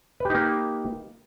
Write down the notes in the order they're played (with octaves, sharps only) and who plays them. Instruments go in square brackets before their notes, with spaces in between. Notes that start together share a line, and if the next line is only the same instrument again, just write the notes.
[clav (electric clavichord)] B4
G4
D#4
A#3